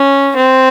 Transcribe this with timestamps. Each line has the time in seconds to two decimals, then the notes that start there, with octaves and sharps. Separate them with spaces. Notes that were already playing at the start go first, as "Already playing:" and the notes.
Already playing: C#4
0.36 C4